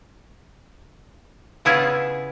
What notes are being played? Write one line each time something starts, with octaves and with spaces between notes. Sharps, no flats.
C#3 B3 C#4 E4 F4 G#4